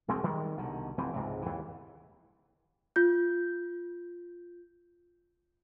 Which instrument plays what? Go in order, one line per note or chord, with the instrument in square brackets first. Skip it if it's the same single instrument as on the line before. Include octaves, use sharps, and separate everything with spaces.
[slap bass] E1 D2 G#3 C4
D#3 G3 G#3
C2 B2 D3 D#3
F1 E3 C4
C#2 G#2 C3
D#2 E3
[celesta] F4 G6